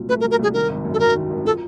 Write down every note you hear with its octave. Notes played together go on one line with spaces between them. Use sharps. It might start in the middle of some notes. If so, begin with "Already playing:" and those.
Already playing: C2 A#2 F#3
A3 B4
A#4
F#3
A#4
C2 G#4
D#3 A#4
G#1
F#2
A4
F#3 A#4
D#3
G#1
F3 A4